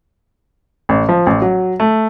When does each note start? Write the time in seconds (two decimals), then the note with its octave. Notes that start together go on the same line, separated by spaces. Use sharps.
0.89 A1
1.09 F3
1.26 A1
1.42 F#3
1.80 A3